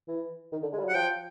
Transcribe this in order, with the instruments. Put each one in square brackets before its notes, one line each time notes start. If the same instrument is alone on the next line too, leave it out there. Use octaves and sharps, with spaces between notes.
[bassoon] E3
D#3
D3
G#3
G3
F#3
[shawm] F#5
[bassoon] F3 [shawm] G5